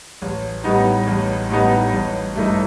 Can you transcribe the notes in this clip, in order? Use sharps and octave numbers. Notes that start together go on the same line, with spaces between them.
A1
A2 G3 B3 D#4
A1
A2 G3 B3 D#4
A1
G2 E3 A3 D#4